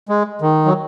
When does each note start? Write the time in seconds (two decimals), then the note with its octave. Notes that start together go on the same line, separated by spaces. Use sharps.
0.09 G#3
0.42 D#3
0.66 F#3